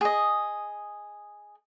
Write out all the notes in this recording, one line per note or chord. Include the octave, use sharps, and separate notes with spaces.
G#4 D#5